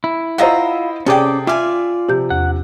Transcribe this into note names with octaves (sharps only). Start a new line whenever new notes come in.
E4
F4 C5 D#5 E5 F#5 A#5
C3 C#4 G#4 A4 D5 G5 D6
F4 D5 E5 G#5 D6 F6
C3 F3 G4 G6
E2 F#5